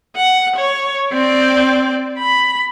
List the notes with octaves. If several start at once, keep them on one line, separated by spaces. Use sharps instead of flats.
F#5
C#5
C4 D5
B5